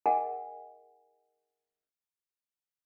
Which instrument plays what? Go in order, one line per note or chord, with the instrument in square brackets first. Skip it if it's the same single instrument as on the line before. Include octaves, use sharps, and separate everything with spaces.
[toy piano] G#4 A#4 D#5 F#5 G#5